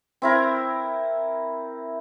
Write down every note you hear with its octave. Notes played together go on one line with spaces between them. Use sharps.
C4 E4 A#4